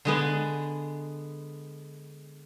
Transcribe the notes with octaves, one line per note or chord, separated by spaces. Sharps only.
D3 G#3 B3